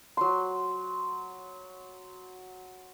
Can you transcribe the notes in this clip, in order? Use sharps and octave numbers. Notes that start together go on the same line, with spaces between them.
F#3 C6